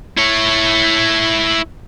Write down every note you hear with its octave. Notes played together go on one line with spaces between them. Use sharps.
E4 C#5